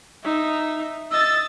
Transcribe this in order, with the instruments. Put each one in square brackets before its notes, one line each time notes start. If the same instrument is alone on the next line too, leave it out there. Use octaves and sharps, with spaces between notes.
[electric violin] D#4 E5
[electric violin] D#5 A6 [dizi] E6